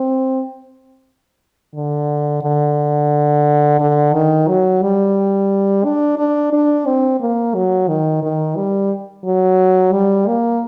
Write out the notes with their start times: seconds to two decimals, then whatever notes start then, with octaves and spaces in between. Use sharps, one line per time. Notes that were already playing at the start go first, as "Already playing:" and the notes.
Already playing: C4
1.75 D3
2.42 D3
3.80 D3
4.13 D#3
4.48 F#3
4.82 G3
5.85 D4
6.18 D4
6.53 D4
6.86 C4
7.20 A#3
7.55 F#3
7.89 D#3
8.23 D#3
8.56 G3
9.25 F#3
9.93 G3
10.27 A#3